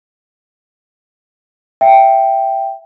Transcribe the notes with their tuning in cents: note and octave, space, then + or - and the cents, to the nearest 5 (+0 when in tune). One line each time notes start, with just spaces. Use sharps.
E5 +5 G5 +0